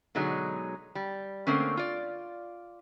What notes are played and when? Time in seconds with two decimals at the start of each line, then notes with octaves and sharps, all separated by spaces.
0.15 B2 D3 F#3 G#3 D#4
0.95 G3
1.47 D3 A3 A#3 C4 C#4
1.77 F4 D5